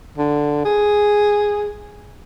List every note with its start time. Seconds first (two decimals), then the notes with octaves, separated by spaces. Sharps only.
0.18 D3
0.65 G#4